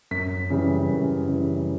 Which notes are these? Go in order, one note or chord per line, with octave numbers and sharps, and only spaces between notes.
F#2 B6
C#3 E3 G3
F#2
C#3 E3 G3